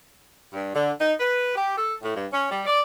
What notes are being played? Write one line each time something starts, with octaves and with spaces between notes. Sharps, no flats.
G2
D3
D#4
B4
G4
A4
A2
G2
C#4
G3
D5